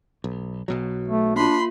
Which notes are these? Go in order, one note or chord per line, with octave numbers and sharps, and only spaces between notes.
B1
B1 B2 F#3
A3
A#3 D4 F4 B5 C6